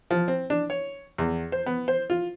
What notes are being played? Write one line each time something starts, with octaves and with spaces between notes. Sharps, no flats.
F3
C4
D4
C#5
E2
C5
B3
C5
F4